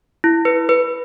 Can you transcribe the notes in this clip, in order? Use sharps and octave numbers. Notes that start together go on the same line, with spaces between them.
E4
B4
B4